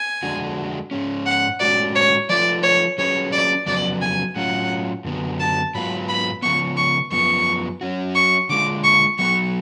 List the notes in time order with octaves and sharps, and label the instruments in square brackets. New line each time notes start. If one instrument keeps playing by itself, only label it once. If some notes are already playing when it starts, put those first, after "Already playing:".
Already playing: [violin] G#5
[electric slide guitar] F2 D3 G#3 D4 F#4
G#2 G#3 C#4
[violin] F#5
[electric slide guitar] A2 G#3 C#4 F#4 [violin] D5
[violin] C#5
[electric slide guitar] F3 A3 F4 B4 [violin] D5
[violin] C#5
[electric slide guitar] F#3 C#4 G#4 B4 [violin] C#5
[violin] D5
[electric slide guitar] F2 C#3 F#3 B3 [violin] D5
[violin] G#5
[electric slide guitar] A2 F#3 C#4 F4 [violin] F#5
[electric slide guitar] F#2 D3 F#3 B3
[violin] A5
[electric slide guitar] G#2 F#3 B3 F4 B4 [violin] B5
[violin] B5
[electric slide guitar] C#3 F3 B3 [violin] C#6
[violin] C#6
[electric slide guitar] F#2 F3 B3 [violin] C#6
[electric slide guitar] F#3 C#4 F#4
[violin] C#6
[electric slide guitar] D3 G#3 D4 F4 [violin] D6
[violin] C#6
[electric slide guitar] F#3 B3 F#4 [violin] C#6